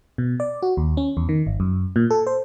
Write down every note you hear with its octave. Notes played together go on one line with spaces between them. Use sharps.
B2
D5
F#4
D#2
C#4
E2
D#3
G1
F#2
A#2
A4
C5